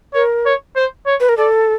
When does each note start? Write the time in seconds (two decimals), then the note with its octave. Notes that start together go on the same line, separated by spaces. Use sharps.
0.14 A#4 C#5
0.46 C#5
0.76 C5
1.06 C#5
1.20 B4
1.29 A#4
1.37 A4 D5